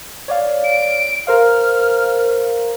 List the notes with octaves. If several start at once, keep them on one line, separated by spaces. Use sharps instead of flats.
C#5 D5 F5
D7
A#4 C5 F5 F6